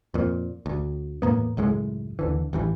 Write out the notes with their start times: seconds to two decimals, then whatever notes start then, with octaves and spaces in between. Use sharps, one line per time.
0.14 F2 A#2
0.66 D2
1.22 E2 A2 A#3 B3
1.57 C#2 F#2 A2 G#3
2.19 D#2 D3 E3
2.53 A1 G2 E3